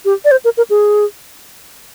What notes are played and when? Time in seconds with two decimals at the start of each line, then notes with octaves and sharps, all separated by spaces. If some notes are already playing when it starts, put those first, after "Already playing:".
0.05 G4
0.25 D5
0.31 C5
0.44 A#4
0.57 A#4
0.70 G#4